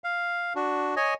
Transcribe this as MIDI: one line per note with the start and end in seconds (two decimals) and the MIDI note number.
0.04 0.53 77
0.56 0.95 62
0.56 0.95 66
0.96 1.14 73
0.96 1.14 75
0.96 1.14 80